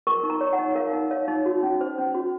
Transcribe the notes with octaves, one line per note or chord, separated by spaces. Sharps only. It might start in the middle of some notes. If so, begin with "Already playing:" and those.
A#4 C#6
D#4
A#5
C#5
F#5
D#4
A#4 F5
D#4
C#5 F5
D#4
F#4
C#4
C5
C#4
F#4